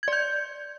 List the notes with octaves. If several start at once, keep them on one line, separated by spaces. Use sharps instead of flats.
D5 G6 G#6